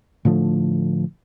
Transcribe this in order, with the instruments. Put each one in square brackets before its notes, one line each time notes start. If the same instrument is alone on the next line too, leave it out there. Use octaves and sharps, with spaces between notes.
[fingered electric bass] A2 D3 F3 A3